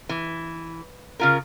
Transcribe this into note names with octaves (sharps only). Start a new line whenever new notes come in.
E3
C#3 F4 A#4